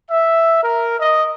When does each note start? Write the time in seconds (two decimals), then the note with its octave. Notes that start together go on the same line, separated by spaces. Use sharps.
0.11 E5
0.63 A#4
1.00 D#5